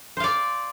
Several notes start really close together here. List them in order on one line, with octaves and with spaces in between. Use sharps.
C5 F5 D5